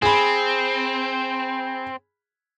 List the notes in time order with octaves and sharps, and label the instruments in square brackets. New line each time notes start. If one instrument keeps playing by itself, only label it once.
[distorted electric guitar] C4 [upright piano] G#4 B5